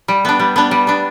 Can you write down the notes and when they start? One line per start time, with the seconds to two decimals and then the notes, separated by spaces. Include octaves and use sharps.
0.08 G3
0.25 B3 D4
0.40 G3
0.56 B3 D4
0.71 G3
0.87 B3 D4